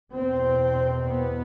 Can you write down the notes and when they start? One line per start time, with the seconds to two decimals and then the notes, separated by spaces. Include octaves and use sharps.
0.13 E2 B2 C4
1.06 B3